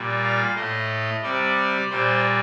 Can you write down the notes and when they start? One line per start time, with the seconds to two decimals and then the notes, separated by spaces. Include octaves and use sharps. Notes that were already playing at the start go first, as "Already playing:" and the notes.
Already playing: A#2 G3
0.23 F5
0.56 A2 A3 D#5
1.23 C3 G3 D5
1.91 A#2 G3 C5